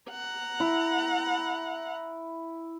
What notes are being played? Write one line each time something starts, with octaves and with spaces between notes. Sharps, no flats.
F#5 A#5
E4